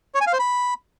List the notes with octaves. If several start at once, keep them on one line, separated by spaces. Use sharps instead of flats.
C#5
G#5
F5
C5
B5